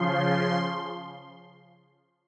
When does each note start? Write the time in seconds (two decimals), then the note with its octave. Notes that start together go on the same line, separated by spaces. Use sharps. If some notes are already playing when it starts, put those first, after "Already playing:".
Already playing: C#3 F3 C6